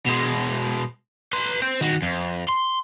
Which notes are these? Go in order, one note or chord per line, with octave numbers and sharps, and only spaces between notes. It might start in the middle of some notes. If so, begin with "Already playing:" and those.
B2 G#3
B4 C6
C5 G5
D#3 F#4
F2
C6